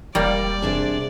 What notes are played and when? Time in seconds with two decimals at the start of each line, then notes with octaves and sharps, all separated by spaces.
0.15 E1 G3 A#3 D5
0.62 C3 D4 G#4